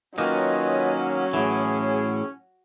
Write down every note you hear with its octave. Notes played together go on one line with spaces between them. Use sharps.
D#3 F#3 A#3 C#4 D#4 F4 B4 D#5
A2 E3 G#4